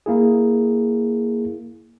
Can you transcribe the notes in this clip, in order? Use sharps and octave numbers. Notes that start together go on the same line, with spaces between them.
A#3 E4 G#4